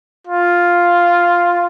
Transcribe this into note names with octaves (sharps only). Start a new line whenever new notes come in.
F4